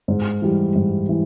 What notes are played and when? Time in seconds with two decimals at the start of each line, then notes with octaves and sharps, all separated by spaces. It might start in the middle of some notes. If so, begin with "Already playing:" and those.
0.08 G#2
0.42 E3 G3
0.75 G#2
1.09 E3